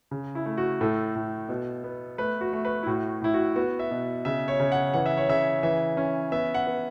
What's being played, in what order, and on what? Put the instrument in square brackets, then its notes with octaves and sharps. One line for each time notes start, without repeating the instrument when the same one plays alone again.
[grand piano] C#3
E4
A3
F#4
A2 A4
A2
B2
B3
A3 B4
F#4
A3
B4
E4
A2 F#4
A2 E4
F#4
B3 F#4
E5
B2
C#3 E5
C#5
C#3
F#5
E3 F#5
E5
C#5
C#3 E5
E3 E5
C#4
B3 E5
F#5
B3